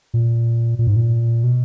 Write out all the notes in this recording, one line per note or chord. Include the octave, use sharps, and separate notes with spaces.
A#2
A#2
G#2
A#2
B2